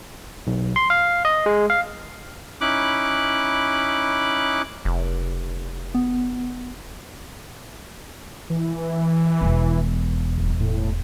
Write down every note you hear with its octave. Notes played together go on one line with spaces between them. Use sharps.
B1
C6
F5
D#5
G#3
F5
C#4 D#4 E4 B5 D6 F#6
F1
B3
E3
E1 E2
D1
A2